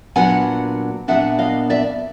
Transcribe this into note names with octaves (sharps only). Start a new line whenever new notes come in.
A#2 F#3 B3 D4 F#5 G#5
A#2 F#3 B3 D4 E5 F#5
D#5 F5
D5 E5